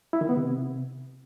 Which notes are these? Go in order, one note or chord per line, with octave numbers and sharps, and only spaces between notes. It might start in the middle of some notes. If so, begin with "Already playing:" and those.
E4
D#3
B3
C3